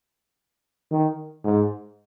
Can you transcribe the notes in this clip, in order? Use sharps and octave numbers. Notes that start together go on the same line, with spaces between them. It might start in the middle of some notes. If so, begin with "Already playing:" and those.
D#3
G#2